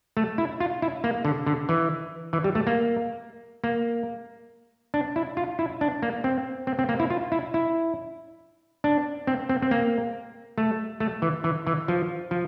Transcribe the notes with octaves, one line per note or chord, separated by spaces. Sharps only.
A3
E4
F4
E4
A#3
D3
D3
E3
E3
G3
A3
A#3
A#3
D4
E4
F4
E4
D4
A#3
C4
C4
C4
A#3
E4
F4
E4
E4
D4
C4
C4
C4
A#3
A3
A3
E3
E3
E3
F3
F3